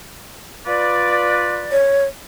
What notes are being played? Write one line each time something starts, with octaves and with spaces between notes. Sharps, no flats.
F4 B4 D5
C#5